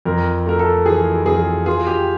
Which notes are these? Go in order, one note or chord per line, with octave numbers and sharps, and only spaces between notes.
F2 A#4
A3 A#4
A4
E3 G#4
F2 G#4
F4 G#4
G4